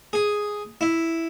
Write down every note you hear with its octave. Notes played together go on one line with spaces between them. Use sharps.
G#4
E4